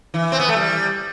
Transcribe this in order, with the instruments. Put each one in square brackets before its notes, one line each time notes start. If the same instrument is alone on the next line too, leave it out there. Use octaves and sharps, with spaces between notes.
[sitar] E3
C4
B3
A3
G3